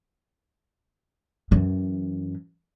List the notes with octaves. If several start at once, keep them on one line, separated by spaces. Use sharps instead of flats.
F#2 E3